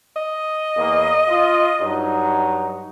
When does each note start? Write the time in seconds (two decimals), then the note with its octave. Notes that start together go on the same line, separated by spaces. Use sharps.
0.16 D#5
0.76 E2 A#3
1.28 F4
1.81 G2 F#3 D#4